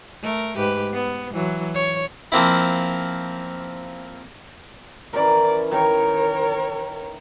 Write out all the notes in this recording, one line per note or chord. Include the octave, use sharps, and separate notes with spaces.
A3 A#4
G#2 G4 B4
B3
E3 F#3
C#5
F3 A#3 C4 E4
E3 C#4 A#4 D5
D#3 A#4 C#5